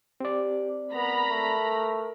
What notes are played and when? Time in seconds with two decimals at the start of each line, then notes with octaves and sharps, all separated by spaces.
0.20 C4 G4 D5
0.94 B3 A#4 A#5 B5
1.30 A3